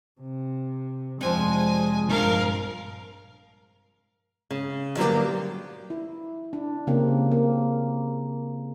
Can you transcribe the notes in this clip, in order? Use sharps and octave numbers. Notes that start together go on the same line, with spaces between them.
C3
F1 F3 G#3 C4 D4 G#5
A#1 G2 G3 A#4 F5
C#3
D3 F#3 G3 A#3 B3 G4
E4
D4
C#3 A#3 C4 G4
A#3